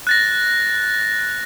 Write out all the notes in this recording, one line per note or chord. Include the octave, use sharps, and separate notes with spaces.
F#6 A6 A#6